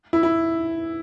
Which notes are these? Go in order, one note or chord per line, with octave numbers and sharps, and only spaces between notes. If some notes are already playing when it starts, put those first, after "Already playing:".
E4
E4